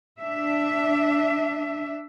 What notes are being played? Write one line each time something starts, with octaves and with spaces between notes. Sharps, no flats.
D4 E5